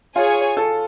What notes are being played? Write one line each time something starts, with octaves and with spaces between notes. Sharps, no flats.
F4 G#4 C#5 G#5
A4